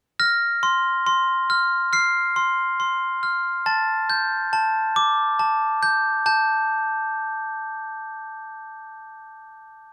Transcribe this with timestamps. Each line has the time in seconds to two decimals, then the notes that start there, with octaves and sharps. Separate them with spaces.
0.20 F6 A#6
0.63 C6
1.07 C6
1.50 F6
1.93 F6 C7
2.36 C6
2.80 C6
3.23 F6
3.66 A5 A6
4.10 G6
4.53 A5
4.96 D6
5.39 A5
5.83 G6
6.26 A5 G6